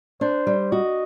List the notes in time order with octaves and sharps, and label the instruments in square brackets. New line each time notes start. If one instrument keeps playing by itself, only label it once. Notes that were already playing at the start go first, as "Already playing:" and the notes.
[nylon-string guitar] D4 [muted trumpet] C5
[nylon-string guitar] G3
[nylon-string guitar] F#4 [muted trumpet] D#5